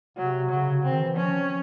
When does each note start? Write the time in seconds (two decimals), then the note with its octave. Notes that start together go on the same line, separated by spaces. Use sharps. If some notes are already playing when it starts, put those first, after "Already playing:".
0.17 C3 F#3
0.50 C#3 F#3
0.84 C4
0.90 D#3
1.01 E3
1.17 F3 C#4